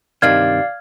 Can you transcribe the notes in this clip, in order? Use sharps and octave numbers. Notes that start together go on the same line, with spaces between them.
G2 C3 D#3 D5 F5 F6 G#6